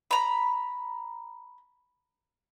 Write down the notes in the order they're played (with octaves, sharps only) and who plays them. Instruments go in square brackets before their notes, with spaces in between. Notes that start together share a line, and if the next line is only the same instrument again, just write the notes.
[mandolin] A#5 B5